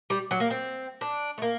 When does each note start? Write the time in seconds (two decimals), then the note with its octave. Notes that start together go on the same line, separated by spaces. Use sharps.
0.10 G3
0.31 F#3
0.40 A#3
0.51 C4
1.01 D4
1.38 A3
1.42 A#3